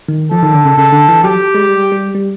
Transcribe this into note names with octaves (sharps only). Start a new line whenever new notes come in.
D#3
F3 A4
D#3
D3
C#3
C#3 A4
D3
E3
F#3 G4
G#3
G3
G3
G3